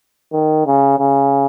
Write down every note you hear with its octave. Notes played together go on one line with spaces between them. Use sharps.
D#3
C#3
C#3